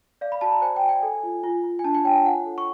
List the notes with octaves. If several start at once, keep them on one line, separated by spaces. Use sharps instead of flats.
D5 F5
B5
F#4 A5
A#5
C5 G#5
G5
F#4
G#5
A4
F4
F4
F4
G#5
D4 A5
G#5
C#5 G5
F4 F#5
A4
C#6